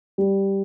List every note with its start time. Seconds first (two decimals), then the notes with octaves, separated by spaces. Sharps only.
0.18 G3